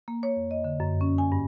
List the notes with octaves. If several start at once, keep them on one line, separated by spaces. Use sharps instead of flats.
A#3
C#5
F2
D#5
D3
F#2
C#4
G#5
G2